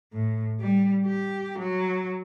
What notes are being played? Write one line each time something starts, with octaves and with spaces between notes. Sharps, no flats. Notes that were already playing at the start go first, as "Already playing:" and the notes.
A2
G3
G4
F#3